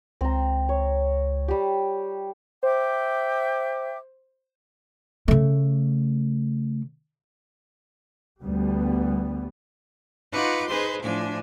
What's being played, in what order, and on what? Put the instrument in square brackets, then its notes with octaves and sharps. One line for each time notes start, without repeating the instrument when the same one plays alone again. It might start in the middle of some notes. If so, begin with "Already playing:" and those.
[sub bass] C#2 [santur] C4 A#5
[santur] C#5
G3 G4
[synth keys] C5 [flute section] E5 G5 D6
[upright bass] C#3 A3
[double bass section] D2 G3 B3
[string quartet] D#4 F4 B4 F#5 C#6 D6
D#4 G#4 B4 C5 C6
A2 F3 D4 G#5